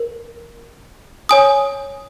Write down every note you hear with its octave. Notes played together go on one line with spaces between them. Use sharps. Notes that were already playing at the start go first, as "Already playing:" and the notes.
Already playing: A#4
C#5 G#5 D#6